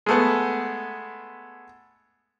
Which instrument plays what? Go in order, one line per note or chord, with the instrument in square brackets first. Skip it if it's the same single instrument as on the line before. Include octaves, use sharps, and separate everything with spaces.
[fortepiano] G#3 A3 B3